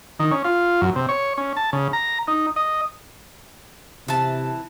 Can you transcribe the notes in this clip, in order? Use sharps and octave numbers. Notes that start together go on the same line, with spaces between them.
D#3
C#4
F4
F#2
C3
C#5
C#4
A5
C#3
A#5
D#4
D#5
C3 E3 A5